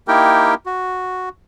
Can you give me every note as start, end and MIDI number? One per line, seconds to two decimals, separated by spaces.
0.08 0.54 58
0.08 0.54 63
0.08 0.54 64
0.08 0.54 67
0.08 0.54 70
0.08 0.54 79
0.66 1.29 66